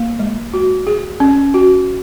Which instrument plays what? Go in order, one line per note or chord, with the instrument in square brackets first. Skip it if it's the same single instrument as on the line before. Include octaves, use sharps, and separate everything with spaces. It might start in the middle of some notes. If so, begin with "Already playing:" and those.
Already playing: [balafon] A#3
G#3
F#4
G#4
C#4
F#4